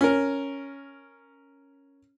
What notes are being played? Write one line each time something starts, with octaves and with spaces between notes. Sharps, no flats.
C#4 A#4